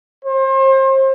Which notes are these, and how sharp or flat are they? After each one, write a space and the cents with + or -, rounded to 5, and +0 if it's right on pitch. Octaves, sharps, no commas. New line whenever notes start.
C5 +35